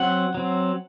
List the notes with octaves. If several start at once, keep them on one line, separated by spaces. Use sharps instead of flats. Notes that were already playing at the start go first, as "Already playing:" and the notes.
Already playing: F#3 C4 F#5
F#3 C4